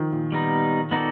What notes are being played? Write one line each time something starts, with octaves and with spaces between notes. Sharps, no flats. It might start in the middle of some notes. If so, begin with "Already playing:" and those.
Already playing: D#3 F3
A#2
G3 B3 D#4
B3 D#4 F#4 A4 D5